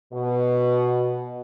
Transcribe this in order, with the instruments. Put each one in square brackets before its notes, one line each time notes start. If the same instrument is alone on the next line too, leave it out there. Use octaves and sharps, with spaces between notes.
[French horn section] B2